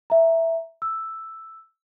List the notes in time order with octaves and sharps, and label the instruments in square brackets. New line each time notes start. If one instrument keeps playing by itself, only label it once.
[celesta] E5 A#5
E6